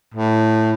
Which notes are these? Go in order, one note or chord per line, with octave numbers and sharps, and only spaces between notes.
A2